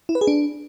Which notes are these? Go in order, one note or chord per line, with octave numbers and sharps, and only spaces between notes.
E4
B4
G#4
D4